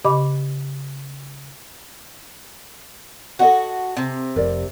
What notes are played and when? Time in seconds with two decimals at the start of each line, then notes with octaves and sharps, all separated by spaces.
0.05 C#3 G4 D#5 B5 D6
3.39 F#4 A4 D#5 F#5
3.97 C3
4.36 F1 A#4 D5